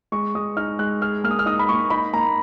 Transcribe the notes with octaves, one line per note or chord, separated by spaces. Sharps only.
G#3 C#6
G#3 D#6
D#4 F6
G#3 F#6
G#4 F6
A#3 F6
D#6
F6
D#4 D#6
B5
A#3 C#6
D#4 B5
A#3 A#5